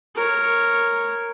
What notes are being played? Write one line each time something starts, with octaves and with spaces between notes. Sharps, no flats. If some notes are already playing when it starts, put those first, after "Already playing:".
A#4 C#5